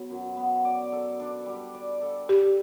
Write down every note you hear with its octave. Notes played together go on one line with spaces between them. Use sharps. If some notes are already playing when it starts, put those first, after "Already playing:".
Already playing: F#3 B3
F#2
B3
D5
A4
D4
G3
D5
A4
E4 G4